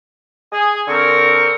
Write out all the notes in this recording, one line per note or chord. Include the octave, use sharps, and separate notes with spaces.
G#4
D3 C4 A#4 C#6